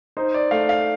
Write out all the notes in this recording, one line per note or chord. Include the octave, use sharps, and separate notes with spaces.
D#4 C5
D5
A3 F5
F5